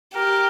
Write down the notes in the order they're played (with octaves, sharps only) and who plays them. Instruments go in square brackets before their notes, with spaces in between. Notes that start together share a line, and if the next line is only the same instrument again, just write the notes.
[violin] G4 [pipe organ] A#4